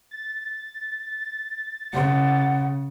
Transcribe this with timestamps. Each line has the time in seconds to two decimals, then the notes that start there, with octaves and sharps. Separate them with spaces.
0.11 A6
1.94 C#3 F#5